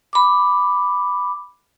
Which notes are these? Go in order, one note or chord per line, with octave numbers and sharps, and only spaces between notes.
B5 D6